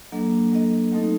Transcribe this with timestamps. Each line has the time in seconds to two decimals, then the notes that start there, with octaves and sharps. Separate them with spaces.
0.12 F#3 A#3 D4 A4 D#5
0.52 F#3 A#3 D4 A4 D#5
0.92 F#3 A3 C4 D#4 A4